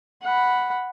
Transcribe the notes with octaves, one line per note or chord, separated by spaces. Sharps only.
F#5 B5